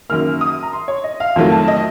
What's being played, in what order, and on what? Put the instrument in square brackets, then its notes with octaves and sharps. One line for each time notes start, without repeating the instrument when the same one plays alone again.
[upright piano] F#2 D#3 A#3 F6
D#6
A#5
C6
C#5
D#5
F5
F2 D#3 F#3 A3
A5
D#5